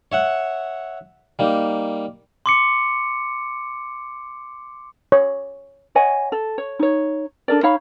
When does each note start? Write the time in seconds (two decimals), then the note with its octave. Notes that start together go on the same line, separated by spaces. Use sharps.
0.12 C#5 E5 F#5
1.39 G3 A#3 D#4
2.46 C6 D6 C#7
5.12 C#5
5.95 C#5 D#5 F#5 G#5
6.32 A4
6.58 C#5
6.79 D#4 C#5
7.48 D4 A4 A#4 D5
7.63 D#4 C#5 F5 B5